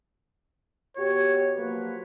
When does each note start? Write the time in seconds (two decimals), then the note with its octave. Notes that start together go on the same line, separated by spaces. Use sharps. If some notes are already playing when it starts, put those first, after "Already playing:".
0.97 B2 F#4 G4 C#5
1.56 F3 F#3 A#3 B4